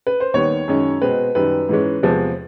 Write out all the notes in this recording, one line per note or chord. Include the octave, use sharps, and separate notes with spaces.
B4
C5
D#2 D#3 G3 B3 C#5
F#2 D#3 G#3 C#4
B2 G#3 C4 B4
F#2 D#3 G3 B4
G#2 E3 G#3 C#4
E2 C3 F3 G#3 B3